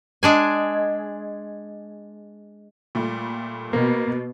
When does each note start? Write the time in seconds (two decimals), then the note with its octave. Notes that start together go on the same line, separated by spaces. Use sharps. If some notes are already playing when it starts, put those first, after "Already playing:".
0.23 G#3 D4 G#5
2.95 A#2 G3 A3
3.73 B2 A#3